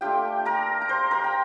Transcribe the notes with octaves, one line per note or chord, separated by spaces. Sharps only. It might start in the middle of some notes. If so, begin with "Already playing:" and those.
A3 D4 F4 G4 G5
A#4 A#5
A#5
C5 C6
A#4 A#5
G5